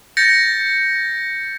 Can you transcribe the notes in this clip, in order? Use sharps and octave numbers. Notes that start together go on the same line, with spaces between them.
G6 A6 A#6 C#7